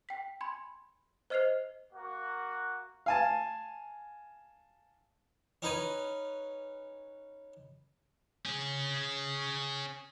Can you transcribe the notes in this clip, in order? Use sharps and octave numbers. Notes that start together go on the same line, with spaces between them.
G5 B6
G#5 B5 C6 G#6
C5 D#5 F6 G#6 C7 F7
A#3 F#4
F5 G#5 A5
C#4 D#4 B4 G#5
C#4 G#4